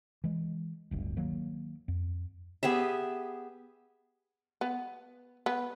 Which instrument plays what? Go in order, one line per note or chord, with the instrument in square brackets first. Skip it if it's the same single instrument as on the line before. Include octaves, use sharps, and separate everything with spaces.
[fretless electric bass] E3 G#3
D1 G1 D2
D#3 F#3 A#3
F2
[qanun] B3 G4 G#4 E5
[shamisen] B3
B3